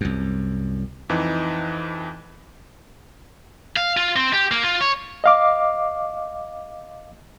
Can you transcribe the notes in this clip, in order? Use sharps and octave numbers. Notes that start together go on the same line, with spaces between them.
C2 F#2
F2 E3 D#4
F5
F4
C4
G4
A#3
F4
C#5
D#5 F5 D6